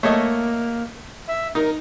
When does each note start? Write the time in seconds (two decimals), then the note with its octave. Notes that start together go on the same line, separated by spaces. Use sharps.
0.03 A3 A#3 C#5 D#5
1.28 E5
1.55 D#4 A#4